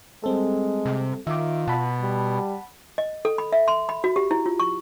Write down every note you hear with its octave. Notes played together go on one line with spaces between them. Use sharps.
G3 G#3 C4 A4
C3
D#3 F4 E5 D6
B2 F#5 A5 B5
G3
D#5
A4
B5
E5
C6
B5
F#4
G4
E4
F4
C#6